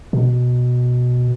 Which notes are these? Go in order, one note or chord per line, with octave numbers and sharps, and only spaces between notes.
B2